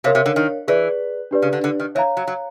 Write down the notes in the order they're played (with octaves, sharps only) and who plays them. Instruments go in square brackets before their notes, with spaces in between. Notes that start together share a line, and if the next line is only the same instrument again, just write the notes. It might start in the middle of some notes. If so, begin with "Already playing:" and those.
[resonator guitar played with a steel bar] C3 [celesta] A#4 C#5 F5
[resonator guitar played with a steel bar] C3
D3
D#3
[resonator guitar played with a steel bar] E3 [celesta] G#4 B4 D5
[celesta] D4 G4 B4 D5
[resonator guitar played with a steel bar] C#3
D3
D3
D#3
[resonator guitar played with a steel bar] E3 [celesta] C#5 F5 A#5
[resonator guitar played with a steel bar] F#3
F#3